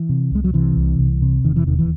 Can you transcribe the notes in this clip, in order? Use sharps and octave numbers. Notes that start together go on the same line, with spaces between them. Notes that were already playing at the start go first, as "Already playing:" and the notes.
Already playing: E3
C3
C2 G#3
F#3
C3 E3
C2
C2
C3
E1 D#3
E3
D#2 D#3
E3